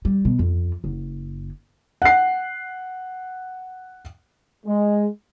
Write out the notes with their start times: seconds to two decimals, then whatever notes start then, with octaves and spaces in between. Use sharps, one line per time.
0.05 G3
0.25 B2
0.39 F2
0.84 F#1
2.02 F#5 C7
4.66 G#3